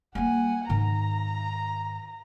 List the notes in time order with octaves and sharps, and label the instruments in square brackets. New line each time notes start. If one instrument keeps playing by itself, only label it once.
[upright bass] G3 A#3 [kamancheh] F#5 G#5
[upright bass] G#2 D#3 [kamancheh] A#5